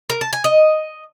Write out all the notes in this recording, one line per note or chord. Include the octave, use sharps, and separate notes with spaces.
A#4
A5
G#5
D#5